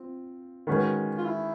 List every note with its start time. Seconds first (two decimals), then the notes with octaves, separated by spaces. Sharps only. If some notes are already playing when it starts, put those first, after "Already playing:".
Already playing: C4 F4
0.67 D#3 G#3 C#4 F#4 B4
1.18 F4
1.26 E4